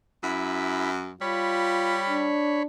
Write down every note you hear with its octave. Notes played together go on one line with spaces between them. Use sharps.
F#2 E4 B5
G3 F4 C#5 B5
D4